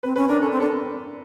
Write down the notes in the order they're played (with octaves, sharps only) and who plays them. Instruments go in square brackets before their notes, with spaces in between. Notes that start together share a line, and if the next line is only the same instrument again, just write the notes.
[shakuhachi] C4 [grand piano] B4
[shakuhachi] C#4 [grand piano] B4
[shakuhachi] D4 [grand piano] A#4
[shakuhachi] C#4 [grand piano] A4
[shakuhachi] C4
[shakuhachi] D4 [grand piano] A4